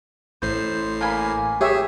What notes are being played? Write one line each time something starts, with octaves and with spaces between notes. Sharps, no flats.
A1 A2 C5 C7
A#3 G#5 B5
G4 G#4 C#5 E5